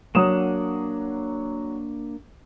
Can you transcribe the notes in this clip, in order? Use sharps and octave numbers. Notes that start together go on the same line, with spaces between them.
F#3 A#3 D4 F#5 D#6 E7